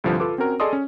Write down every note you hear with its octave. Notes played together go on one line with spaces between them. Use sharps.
C2 G2 D3 F3
F4 A4 B4 D6
C4 C#4 F#4 A#4
G#4 A4 D5 D#5 C6 D#6
C#4